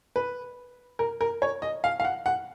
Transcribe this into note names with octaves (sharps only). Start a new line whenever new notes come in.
B4
A#4
A#4
C#5
D#5
F5
F5
F#5
F#5